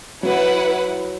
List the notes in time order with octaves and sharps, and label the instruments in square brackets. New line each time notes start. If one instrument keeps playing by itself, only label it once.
[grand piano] F#3 [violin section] E4 B4 F#5